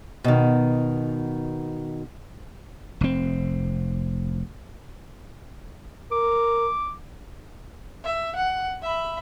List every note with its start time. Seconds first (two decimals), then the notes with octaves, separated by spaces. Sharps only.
0.24 B2 D#3
3.01 F1 C4
6.12 A#4 D6
8.04 E5
8.35 F#5
8.82 E5 B5